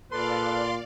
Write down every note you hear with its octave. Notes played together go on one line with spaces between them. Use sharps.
A#2 A4 B4 D5 F5 C6